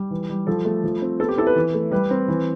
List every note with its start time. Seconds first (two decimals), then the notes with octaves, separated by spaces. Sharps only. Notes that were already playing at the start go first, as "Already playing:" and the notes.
Already playing: G3
0.11 E3
0.30 G3
0.47 F3 A4
0.65 A3
0.84 F3
1.02 C4
1.19 B3 A4
1.29 G4
1.38 E4 A4
1.47 B4
1.56 E3
1.74 A3
1.91 G3 B4
2.10 C4
2.28 E3